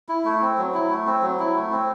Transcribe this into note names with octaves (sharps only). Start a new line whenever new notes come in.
E4
A3
C4
F#3
E4
A3
C4
F#3
E4
A3
C4